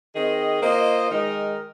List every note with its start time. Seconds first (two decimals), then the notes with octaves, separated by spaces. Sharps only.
0.15 D#3 C4 G#4 D#5
0.62 A#3 F4 C5 D#5
1.11 D#3 G#3 D#4 A#4